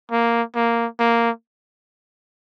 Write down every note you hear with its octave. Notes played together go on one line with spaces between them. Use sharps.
A#3
A#3
A#3